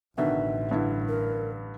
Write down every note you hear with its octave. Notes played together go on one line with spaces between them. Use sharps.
A1 B2 D3 D#3 E5
G2 D3 E4
A#4